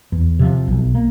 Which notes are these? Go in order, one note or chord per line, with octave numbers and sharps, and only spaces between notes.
E2
C3 F3
B1
A#3